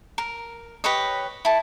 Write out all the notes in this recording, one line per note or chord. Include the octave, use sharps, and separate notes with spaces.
A#4
G4 B4 C#5 D#5
E4 A5